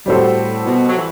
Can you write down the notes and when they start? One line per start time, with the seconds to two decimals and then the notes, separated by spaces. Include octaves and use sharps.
0.06 A2 G3 C4 F#4 A4 C5
0.66 B2
0.89 F#3
0.96 E3